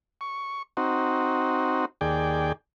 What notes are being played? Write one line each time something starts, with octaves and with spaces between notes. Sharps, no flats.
C#6
C4 D#4 F#4
D#2 G#4 D5 G5